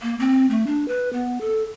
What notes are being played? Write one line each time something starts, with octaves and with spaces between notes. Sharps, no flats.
A#3
C4
A3
D4
B4
B3
A4